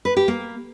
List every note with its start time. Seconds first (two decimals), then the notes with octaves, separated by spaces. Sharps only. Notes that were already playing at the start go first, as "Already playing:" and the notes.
0.05 B4
0.17 G4
0.28 A#3